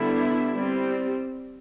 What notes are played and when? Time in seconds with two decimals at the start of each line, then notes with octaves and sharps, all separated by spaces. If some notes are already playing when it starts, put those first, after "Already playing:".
Already playing: D3 G3 B3 D4 E4
0.55 G3 C4